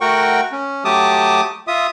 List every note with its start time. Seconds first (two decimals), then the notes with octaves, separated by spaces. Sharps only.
0.01 A3 F#4 A#4 F#5 G5 C#6
0.52 C#4
0.85 F#3 A3 G4 A5 D6 D#6
1.67 F4 E5 D#6